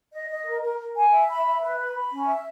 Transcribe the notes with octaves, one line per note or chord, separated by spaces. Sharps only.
D#5
D#5
A#4
A#4
A#4
G#5
E5
B5
E5
B4
B5
B5
C#4
E5